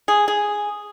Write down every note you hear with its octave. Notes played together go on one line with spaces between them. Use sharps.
G#4
G#4